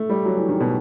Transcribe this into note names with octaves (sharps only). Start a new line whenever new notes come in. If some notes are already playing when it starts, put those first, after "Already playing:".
Already playing: A3
G3
F#3
E3
D#3
B2